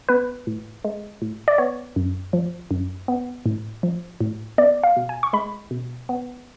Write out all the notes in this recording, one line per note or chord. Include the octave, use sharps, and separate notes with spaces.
B3 B4
A2
G#3
A2
D5
B3 C#5
F#2
F3
F#2
B3
A2
F3
A2
B3 D5
F5
B2
G#5
C#6
G#3 B5
B2
B3